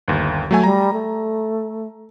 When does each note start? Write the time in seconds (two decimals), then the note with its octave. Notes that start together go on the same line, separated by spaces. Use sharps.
0.08 G1 D#2
0.51 F#3 A3 G#5
0.63 G3 A#5
0.93 A3